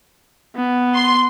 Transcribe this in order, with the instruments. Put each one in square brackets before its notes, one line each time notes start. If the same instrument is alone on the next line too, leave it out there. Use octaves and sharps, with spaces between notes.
[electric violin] B3
[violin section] C6